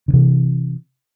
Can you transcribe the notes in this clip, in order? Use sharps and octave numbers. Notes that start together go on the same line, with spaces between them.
D3
C3 E3